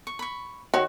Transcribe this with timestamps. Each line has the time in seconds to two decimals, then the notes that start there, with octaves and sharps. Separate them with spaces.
0.07 C#6
0.19 B5 C#6
0.74 D#3 F#4 C#5